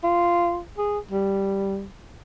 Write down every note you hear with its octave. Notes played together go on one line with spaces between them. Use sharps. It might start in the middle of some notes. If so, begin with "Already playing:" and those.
F4
G#4
G3